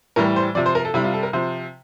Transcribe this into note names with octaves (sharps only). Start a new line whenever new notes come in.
A2 E3 G3 A#4
C5
C3 F3 D5
C5
A#4
A4
C3 G3 E4
F4
A4
A#4
C3 F3 C5